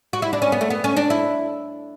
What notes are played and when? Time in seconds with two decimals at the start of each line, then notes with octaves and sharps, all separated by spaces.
0.13 F#4
0.22 E4
0.33 D4
0.42 C#4
0.52 B3
0.61 A3
0.70 B3
0.84 C#4
0.97 D4
1.10 E4